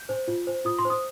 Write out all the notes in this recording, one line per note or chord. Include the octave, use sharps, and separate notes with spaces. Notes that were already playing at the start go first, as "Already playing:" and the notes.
Already playing: G6
C5
F4
C5
F4 D#6
C6
C5
D#6